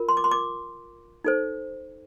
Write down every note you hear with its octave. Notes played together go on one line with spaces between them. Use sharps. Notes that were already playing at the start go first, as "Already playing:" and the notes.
Already playing: F4 A#4
C6
D6
C6
D6
D#4 A4 C5